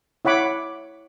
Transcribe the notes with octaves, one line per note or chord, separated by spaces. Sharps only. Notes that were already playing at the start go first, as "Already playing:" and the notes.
E4 C#5 F#5 B5 D6